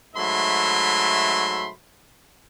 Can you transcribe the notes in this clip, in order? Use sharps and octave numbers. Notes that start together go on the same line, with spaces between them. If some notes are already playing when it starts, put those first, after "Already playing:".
G#2 F#3 A3 E5 B5 C6